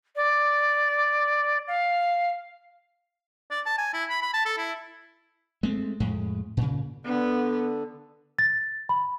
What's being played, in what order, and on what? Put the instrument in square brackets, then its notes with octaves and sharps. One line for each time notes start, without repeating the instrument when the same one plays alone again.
[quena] D5
F5
[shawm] D5
A5
G#5
E4
B5
B5
A5
A4
E4
[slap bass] G#3 A3 C4
F2 A2 G#3
A#2 C#3
[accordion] D3 [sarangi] B3
[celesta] A6
B5